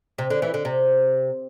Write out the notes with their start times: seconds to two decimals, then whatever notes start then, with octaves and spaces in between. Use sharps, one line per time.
0.18 C3
0.30 D3
0.42 E3
0.54 D3
0.65 C3